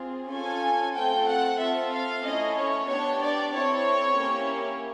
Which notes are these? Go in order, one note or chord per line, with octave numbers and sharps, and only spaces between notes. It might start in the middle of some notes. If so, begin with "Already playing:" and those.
Already playing: C4 F4 G#4
C#4 F4 A4 G#5
A3 C4 F4 A4 G5
F#5
C4 F4 A4 E5
F5
A3 C#4 E4 D#5
C#5
B3 D4 G4 C#5
D5
C4 E4 A4 C#5
A#3 C#4 E4 G4